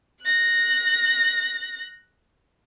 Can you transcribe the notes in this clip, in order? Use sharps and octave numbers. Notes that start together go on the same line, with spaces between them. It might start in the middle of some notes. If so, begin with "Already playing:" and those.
F#6 A#6